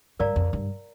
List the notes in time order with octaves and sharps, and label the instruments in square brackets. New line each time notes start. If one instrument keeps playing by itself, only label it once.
[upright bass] G2 [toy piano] A#4 D5 F5 A#5
[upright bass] F2
G2